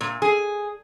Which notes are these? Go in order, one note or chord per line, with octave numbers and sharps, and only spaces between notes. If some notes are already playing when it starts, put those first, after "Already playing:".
A#2
G#4